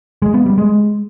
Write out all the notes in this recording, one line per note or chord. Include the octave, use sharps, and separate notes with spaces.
G#3
B3
G3
G#3